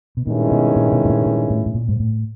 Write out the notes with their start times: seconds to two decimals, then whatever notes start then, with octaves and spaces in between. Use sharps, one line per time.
0.17 B2
0.27 G2 A#2 D#3 G#3 C#4 E4
0.51 B2
0.76 A#2
0.92 B2
1.05 A2
1.09 A#2
1.26 A#2
1.50 A2
1.66 A2
1.74 A#2
1.88 G#2
2.00 A2